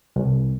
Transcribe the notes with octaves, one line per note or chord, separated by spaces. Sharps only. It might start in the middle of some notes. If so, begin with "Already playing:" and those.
C2